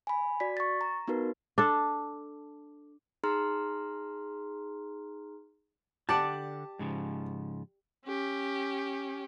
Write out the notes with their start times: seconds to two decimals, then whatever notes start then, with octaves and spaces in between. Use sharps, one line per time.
0.07 G#5 B5
0.40 F#4 D5 B6
0.57 C#6 A6
0.81 A#5
1.08 B3 D#4 F#4 A#4 B4
1.58 D4 A4
3.24 D#4 G#4 A#5 C6 F6
6.09 D3 G4 D5 F#5 A5
6.79 G#2 C#3 F3
8.06 C#4 G4